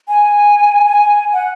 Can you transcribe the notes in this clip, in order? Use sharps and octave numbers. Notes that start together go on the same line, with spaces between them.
G#5
G#5
F#5